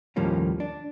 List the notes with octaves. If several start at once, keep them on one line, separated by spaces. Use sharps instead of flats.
D#2 A2 F3 G3 A#3 C#4
D4